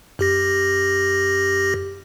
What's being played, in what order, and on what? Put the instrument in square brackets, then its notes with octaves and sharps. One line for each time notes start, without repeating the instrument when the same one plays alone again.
[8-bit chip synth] F#2 G4 A#6